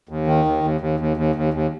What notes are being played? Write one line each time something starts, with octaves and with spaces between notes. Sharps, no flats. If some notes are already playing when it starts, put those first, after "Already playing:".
D#2
D#3
D#2
D#2
D#2
D#2
D#2
D#2
D#2